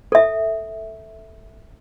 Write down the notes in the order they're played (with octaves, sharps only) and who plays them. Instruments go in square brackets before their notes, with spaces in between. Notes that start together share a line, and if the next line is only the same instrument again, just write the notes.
[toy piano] A4 E5